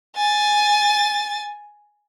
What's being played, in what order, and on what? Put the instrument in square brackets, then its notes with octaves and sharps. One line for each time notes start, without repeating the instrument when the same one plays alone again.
[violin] G#5 A6